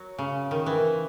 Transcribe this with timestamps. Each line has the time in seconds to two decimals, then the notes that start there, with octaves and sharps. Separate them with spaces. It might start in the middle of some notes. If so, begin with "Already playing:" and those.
Already playing: F#3
0.18 C#3
0.51 D#3
0.66 E3